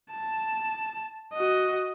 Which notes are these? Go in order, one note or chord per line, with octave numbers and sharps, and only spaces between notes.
A5
F#4 D#5